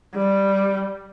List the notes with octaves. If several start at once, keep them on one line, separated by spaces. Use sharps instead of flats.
G3